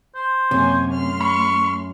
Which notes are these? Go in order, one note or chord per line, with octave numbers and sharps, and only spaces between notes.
C5
F#2 C3 A#3 C#4 G#5
A3 C6 F6
B5 C#6